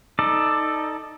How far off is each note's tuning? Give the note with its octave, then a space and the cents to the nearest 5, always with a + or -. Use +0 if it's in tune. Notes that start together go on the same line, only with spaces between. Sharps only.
D#4 +10 A4 +0 D5 +20